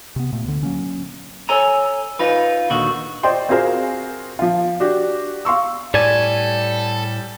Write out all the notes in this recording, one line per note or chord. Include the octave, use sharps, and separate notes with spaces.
C3 B3
A#2 A3
D2 D3
F#3 A#3 C#4
A4 C#5 G#5 A#5
D#4 F4 B4
D#2 A#2 D3 D#3 F#4
C5 D5 D#5 G5 C6
C4 F4 F#4 G#4 A#4 C5
F3 F4
D4 F#4 G4
F5 C6 C#6 E6
A2 G3 A4 D5 G#5 A5